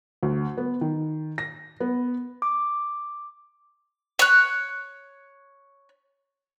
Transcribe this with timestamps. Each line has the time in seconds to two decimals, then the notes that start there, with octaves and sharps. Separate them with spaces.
0.23 D2
0.57 B3
0.81 D#3
1.38 A#6
1.80 B3
2.42 D6
4.19 C#5 F#6